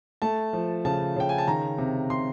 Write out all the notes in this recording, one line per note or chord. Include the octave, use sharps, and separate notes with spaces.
A3 A5
F3
C#3 A5
C#3 G5
G#5
A5
D#3 A#5
C3
C3 C6